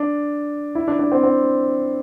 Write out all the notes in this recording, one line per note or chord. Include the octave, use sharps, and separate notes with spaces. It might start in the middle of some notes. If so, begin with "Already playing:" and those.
Already playing: D4
E4
D4
D4
C4
C4